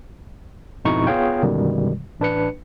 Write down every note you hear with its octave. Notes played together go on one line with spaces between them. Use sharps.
F2 G#2 B2 D#4 E4 C#6
B3 F4 G#4 C#5 F5 G5
F#2 B2 D3 D#3 G3 G#3
A1 D4 B4 C#7